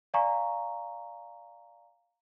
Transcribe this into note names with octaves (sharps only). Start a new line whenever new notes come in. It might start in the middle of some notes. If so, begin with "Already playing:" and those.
D5 F5 G#5 A#5 C#6